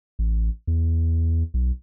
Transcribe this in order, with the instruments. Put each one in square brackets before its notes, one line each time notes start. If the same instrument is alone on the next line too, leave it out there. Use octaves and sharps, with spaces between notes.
[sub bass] A1
E2
B1